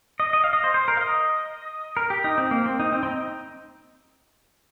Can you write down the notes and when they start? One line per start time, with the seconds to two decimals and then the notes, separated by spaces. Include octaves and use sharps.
0.20 D#5
0.33 D#5
0.44 F5
0.53 D#5
0.64 C5
0.74 C5
0.88 A#4
0.97 F5
1.01 D#5
1.97 A#4
2.10 G4
2.24 D#4
2.38 C4
2.51 A#3
2.66 C4
2.80 D#4
2.92 C4
3.03 C4
3.06 D#4